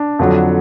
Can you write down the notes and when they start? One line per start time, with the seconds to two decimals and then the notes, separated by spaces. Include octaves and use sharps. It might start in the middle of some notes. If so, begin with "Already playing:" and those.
Already playing: D4
0.19 F2 D3 F#3